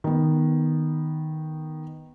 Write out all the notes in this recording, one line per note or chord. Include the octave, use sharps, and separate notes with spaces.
D#3 B3